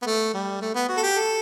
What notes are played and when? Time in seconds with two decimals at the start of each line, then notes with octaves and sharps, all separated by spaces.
0.02 B3
0.06 A3
0.34 G3
0.62 A3
0.75 B3
0.88 F#4
0.97 A4
1.03 G4
1.16 A4